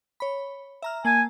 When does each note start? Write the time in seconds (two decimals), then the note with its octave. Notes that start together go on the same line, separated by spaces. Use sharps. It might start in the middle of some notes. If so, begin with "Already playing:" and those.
0.20 C#5 B5
0.82 E5 A#5 F6
1.05 A#3 G#5 A5